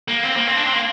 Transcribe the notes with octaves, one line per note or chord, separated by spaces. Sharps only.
A#3
C4
A#3
C4
D4
C4
A#3